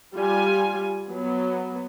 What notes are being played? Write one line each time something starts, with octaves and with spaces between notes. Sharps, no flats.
G3 F4 G#5
F#3 B3